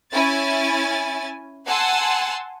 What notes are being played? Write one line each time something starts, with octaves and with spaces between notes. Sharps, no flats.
C#4 E4 G#5 A6
F#5 G#5 A5 C6 E6